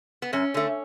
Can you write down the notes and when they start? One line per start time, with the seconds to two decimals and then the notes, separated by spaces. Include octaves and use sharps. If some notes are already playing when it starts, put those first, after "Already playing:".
0.22 B3
0.33 F#2 C#4
0.54 D3 A3